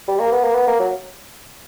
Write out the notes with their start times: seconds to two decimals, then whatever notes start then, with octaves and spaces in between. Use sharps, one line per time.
0.08 G3
0.20 A#3
0.32 B3
0.44 A#3
0.55 B3
0.67 A#3
0.80 F#3